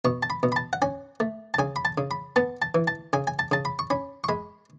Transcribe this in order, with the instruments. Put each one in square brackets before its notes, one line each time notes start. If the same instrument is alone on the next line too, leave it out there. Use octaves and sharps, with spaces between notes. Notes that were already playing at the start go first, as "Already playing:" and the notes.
[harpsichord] B2 C#6
A5
B5
B2
B5
A5
F#5
C#4 G#5
A3
A5
C#3 G#5
B5
A5
C#3
B5
B3 A5
A5
E3
A5
C#3 G#5
G#5
A5
C#3 A5
B5
C#6
C#4 B5
C#6
G#3 B5